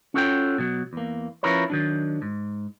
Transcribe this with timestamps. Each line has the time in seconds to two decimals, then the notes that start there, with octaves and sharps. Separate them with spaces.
0.14 C#4 F4 F#4 A4 C#5 G5
0.58 B2 F#3
0.93 E2 A#3
1.43 F3 C#4 E4 A#4 B4 C#5
1.70 D#3 F#3 D4
2.22 G#2